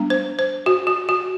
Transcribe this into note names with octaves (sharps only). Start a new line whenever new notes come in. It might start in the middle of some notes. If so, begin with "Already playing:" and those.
Already playing: G3 B3 D4
C5
C5
F#4
F#4
F#4